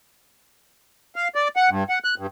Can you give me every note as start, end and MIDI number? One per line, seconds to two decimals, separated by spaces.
1.16 1.28 77
1.35 1.48 74
1.56 1.69 78
1.70 1.84 43
1.89 1.99 78
2.04 2.15 90
2.18 2.27 43